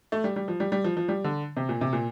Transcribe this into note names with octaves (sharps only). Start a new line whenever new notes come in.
A3
G3
G3
F3
G3
G3
F3
F3
G3
D3
C3
A#2
C3
A#2